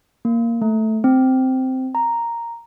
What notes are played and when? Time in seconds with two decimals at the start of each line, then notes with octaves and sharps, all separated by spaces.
0.25 A#3
0.62 A3
1.04 C4
1.95 A#5